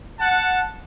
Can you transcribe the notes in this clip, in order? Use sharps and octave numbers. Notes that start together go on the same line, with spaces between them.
F#5 A5